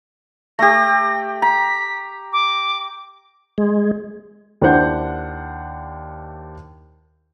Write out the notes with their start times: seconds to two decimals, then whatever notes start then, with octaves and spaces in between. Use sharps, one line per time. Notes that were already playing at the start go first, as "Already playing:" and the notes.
0.59 A3 G4 A#6
1.42 A#5 B6
2.33 D6
3.58 G#3
4.61 D#2 D4 E4 C5 F#5 G6